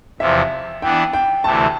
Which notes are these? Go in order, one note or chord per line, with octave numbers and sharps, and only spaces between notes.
E2 C3 F3 E5
E3 B3 D4 G5
G5
D2 C3 E3 A3 A5